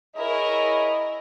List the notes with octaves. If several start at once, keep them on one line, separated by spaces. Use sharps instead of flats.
E4 G#4 A#4 C#5 D#5